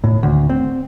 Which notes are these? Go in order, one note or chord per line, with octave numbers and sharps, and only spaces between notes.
A2
D2
C4